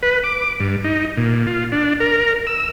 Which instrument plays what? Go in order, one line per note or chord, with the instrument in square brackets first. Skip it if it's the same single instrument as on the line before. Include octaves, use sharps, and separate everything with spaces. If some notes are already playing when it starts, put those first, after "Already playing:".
[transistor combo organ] B4
D6
G2
D#4
A#2
F4
D4
A#4
E6